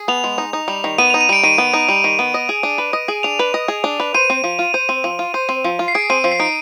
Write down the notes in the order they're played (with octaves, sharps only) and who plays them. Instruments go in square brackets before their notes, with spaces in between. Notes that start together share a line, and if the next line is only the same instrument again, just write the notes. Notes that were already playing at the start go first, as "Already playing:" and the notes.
Already playing: [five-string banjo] G#4
[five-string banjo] B3 [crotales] F7
[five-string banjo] G#3
D#4
D#4
G3
D#3
[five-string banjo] B3 [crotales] D#7
[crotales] F7
[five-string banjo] D#4
[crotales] D#7
[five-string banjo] G3 [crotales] D7
[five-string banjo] D#3 [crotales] D#7
[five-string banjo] B3
D#4
G3
D#3
B3
D#5
G#4
D4
B4
D#5
G#4
[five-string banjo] D4 [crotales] F7
[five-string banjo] B4
D#5
G#4
D4
B4
[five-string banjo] C5 [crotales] D#7
[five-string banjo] C4
F3
F4
C5
C4
F3
F4
C5
C4
F3
F4
[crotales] C7
[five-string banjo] G#4 [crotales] D7
[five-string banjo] C4 [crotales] D#7
[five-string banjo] F3
[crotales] C7
[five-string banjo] D#4 [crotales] D7